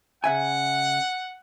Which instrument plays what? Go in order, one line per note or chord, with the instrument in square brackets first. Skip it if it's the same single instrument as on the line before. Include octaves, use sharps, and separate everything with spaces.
[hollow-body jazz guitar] C#3 E5 G#5 [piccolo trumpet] F#5